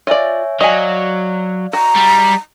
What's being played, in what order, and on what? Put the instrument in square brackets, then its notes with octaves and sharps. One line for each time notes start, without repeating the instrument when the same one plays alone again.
[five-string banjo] F4 D5 [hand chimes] C#5 E5 G#5
[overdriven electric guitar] F#3 [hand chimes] D5 F5 [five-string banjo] D#5 G#5
[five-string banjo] F#4 [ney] A#5
[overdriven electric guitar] G3